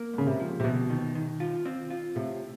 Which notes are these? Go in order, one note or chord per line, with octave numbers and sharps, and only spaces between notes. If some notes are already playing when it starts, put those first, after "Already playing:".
Already playing: A#3
G#2 C#3
C3
F3
C3
D2 B2
D#3
D#3
F4
C4
F4
A2 C3